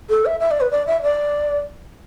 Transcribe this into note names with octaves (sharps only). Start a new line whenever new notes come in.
A4
E5
E5
D5
B4
D5
E5
D5